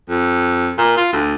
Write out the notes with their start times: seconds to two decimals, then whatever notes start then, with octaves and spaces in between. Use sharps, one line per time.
0.09 F2
0.78 A#2
0.97 F4
1.13 D2